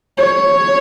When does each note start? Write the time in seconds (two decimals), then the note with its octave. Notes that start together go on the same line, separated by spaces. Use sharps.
0.18 C#5